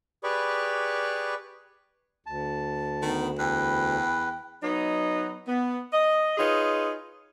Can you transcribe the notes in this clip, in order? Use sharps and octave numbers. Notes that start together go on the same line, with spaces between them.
G4 G#4 B4 D5 B5 C#6
D2 A5
D#3 B3
E2 B4 G5
F#3 B3 D#4
B3
D#5
D#4 F4 G#4 B4 C#5